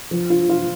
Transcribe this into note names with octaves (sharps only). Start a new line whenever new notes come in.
F3
F4
F4